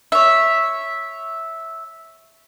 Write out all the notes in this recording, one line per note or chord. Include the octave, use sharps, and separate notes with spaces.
C#5 E5